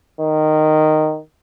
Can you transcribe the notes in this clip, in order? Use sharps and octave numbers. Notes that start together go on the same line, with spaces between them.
D#3